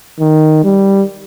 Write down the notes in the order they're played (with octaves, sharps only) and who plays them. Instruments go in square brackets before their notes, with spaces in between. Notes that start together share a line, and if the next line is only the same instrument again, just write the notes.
[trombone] D#3
G3